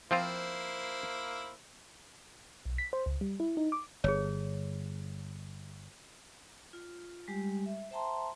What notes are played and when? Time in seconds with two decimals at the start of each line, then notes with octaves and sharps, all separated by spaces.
0.11 F3 A#3 C4 E4 F4 C5
2.65 B1
2.78 B6
2.93 C5
3.06 C#2
3.21 G3
3.40 E4
3.57 D#4
3.72 D6
4.04 G1 G#4 C#5
6.73 F4
7.28 G3 G#3 G4
7.66 E5
7.91 C5 E5 G5 A5 A#5 C6